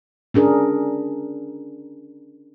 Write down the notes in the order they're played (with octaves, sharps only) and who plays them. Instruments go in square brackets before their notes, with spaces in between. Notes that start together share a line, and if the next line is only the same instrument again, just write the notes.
[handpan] C#4 D4 G#4 A#4